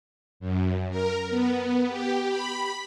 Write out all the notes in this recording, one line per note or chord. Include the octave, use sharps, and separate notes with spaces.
F#2
A#4
B3
G4
B5